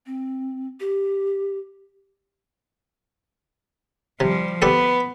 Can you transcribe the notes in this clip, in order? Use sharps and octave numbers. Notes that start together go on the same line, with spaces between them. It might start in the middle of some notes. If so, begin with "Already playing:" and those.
C4
G4
C3 F3 G3
B3 D4 G4 A4 B4